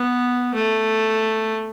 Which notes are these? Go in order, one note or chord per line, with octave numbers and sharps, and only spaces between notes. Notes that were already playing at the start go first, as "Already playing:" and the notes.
Already playing: B3
A3